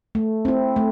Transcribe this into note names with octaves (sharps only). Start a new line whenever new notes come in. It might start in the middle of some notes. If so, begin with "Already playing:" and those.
A3
C4 E4
A3